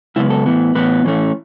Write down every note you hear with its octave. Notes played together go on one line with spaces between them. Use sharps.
F#2 C#3 G#3 B3 E4
A4
A2 E3 B3
A2 E3 B3 B4
A2 E3 A3 C#4